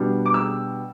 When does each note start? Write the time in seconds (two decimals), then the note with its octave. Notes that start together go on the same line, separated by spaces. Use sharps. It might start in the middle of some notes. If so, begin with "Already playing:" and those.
Already playing: B2 G3 D4
0.26 D6
0.34 E6